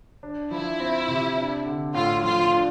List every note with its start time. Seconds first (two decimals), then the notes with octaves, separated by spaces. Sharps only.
0.23 D4
0.51 F3 E4
0.80 C4
1.08 C3
1.37 D4
1.66 D3
1.94 A2 F4
2.23 F3 F4
2.52 D4